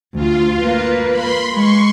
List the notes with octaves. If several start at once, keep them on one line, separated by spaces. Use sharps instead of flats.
D2 F4
A#3 B4
B5 C6
G#3 C6 C#6